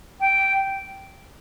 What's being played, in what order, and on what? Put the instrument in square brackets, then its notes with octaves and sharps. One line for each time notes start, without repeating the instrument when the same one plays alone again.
[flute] G5